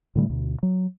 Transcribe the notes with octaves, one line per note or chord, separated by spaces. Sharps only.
A2 D3 G3 A3
D2 B2
F#3